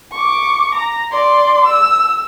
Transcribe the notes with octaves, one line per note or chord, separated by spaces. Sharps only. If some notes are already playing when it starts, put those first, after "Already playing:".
C#6 D6
A#5
D5 C6
E6